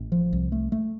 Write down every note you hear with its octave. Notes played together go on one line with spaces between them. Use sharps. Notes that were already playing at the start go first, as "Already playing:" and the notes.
Already playing: A1
F3
C2
A3
A3